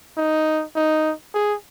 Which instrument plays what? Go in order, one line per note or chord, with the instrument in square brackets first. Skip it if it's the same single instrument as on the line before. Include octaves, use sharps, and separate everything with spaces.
[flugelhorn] D#4
D#4
G#4